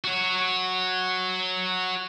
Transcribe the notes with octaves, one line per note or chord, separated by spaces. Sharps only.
F#4 C#5